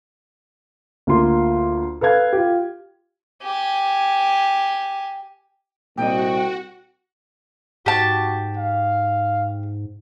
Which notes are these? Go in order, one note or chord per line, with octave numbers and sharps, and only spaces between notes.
D2 A#3 F4 C6
A4 B4 F5 G#6
F4 G4
G4 G#5
C2 A#2 G3 F#4 D#5 G5
G#2 F#4 G4 A5
F5